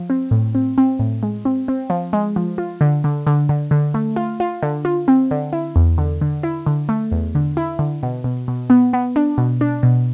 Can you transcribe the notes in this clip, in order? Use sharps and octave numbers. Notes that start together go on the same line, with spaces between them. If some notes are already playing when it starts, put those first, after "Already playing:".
Already playing: F3
C4
A2
C4
C4
A2
G#3
C4
C4
F3
G#3
F3
F4
D3
D3
D3
D3
D3
A3
F4
F4
D3
F4
C4
D3
E4
E2
D3
D3
E4
D3
A3
E2
D3
E4
D3
B2
B2
B2
B3
B3
D4
B2
D4
B2